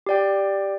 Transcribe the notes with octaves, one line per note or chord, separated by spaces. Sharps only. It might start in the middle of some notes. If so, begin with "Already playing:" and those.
G4 D5 G5